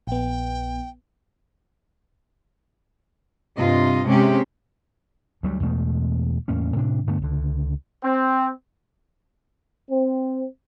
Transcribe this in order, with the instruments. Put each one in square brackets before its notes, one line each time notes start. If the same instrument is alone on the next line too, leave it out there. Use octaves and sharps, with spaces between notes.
[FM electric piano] A#1 B3 [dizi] G5
[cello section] G2 C3 F4 D#5
C3 G#3 C#4 G4
[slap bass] D2 F#3 G3
E2 B2 G#3 A3
E2 A2 A#3 C#4
A2 C3 D4
G2 D3 A3 B3
C#2 D3
[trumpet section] C4
[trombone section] C4